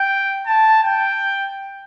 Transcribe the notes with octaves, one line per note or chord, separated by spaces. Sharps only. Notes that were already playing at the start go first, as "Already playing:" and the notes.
Already playing: G5
A5
G5